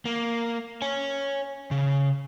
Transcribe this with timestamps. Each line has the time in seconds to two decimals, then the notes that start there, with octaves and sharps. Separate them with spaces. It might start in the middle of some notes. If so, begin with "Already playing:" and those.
0.05 A#3
0.82 C#5 G#5
1.71 C#3